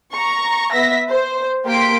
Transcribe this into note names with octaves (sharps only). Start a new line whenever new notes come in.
A#5 C#6
B3 B4 E5 A#6 B6
C5
A#3 G4 G5 C6 B6 D7